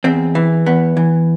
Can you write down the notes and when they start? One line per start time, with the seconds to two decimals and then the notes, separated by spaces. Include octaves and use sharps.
0.04 E2 C4
0.35 E3
0.66 E2 B3
0.97 E3